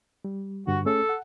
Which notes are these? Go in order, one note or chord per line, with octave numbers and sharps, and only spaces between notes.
G3
G2 D3 F#4
A3 C#4 G#4 A4
F#5